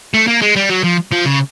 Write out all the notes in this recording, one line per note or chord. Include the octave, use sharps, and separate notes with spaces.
A3
A#3
G#3
G3
F#3
F3
F3
C#3